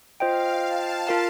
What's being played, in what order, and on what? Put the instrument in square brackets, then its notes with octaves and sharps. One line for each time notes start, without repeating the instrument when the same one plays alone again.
[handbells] F4 C5 D#5 G5 [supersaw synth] F5
[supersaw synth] A5
[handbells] F4 A#4 F5 A5